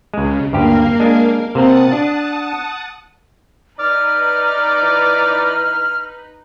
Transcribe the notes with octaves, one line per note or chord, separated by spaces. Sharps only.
C#2 C#3 G#3
D2 G2 A#3 G4 A#4 F5
G#3 D4
C3 A#3 C4 F#5 A5 D#6
D4
D#4 B4 D5 F6
E3